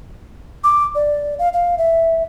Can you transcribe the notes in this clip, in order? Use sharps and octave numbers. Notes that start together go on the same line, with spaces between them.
D6
D5
F5
F5
E5